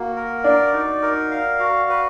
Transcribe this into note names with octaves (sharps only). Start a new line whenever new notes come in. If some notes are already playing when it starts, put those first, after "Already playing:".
Already playing: A#3 F#4
A#4
D4 D5
D#4
A#4
F5
F#4
B4